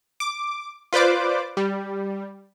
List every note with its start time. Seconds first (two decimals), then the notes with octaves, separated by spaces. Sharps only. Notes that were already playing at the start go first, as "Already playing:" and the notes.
0.20 D6
0.93 F4 B4 C5 D5 D6
1.57 G3